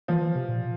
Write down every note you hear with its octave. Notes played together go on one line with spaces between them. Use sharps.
E3 F3
E3
C3
A#2